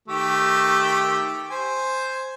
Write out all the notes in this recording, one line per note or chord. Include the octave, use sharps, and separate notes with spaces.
D#3 A3 G4
C5 G#5